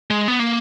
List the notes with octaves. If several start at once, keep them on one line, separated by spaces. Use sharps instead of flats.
G#3
B3
A#3